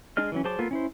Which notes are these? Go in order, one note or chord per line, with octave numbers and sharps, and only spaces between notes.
G#3 D4 G#4 D#5 F6
E3 F#3 C#4
F#3 G#4 C5 A5 D6
A#3 B3 F4 A4
C#4 E4 C5